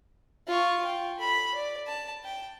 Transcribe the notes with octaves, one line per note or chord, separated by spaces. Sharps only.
F4 C#6
G5
A4 B5
D5
A5
G5